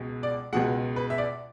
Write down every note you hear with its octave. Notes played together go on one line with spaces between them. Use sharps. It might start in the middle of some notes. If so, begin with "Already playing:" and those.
Already playing: C#2 B2 G#3
D5
C#2 B2 G#3 F#5
B4
E5
D5